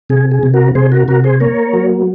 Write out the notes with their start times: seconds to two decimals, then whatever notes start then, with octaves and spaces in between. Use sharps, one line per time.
0.10 C3 G#4
0.31 G#4
0.43 C3
0.54 F#4 A#4
0.75 C3 G#4 C5
0.92 F#4 A#4
1.08 C3 F#4 A#4
1.24 G#4 C5
1.40 A#3 A#4 C#5
1.73 F#3